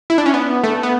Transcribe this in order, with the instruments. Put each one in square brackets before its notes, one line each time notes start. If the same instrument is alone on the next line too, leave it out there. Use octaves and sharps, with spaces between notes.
[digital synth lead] E4
D4
C#4
B3
A3
B3